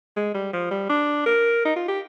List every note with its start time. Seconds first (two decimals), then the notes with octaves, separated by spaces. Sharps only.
0.16 G#3
0.34 G3
0.53 F3
0.71 G3
0.89 D4
1.26 A#4
1.65 D#4
1.76 F4
1.88 G4